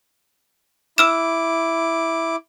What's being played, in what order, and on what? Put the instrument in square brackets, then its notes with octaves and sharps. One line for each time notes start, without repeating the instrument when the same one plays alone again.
[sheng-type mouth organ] E4 D6 [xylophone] E6 F6 E7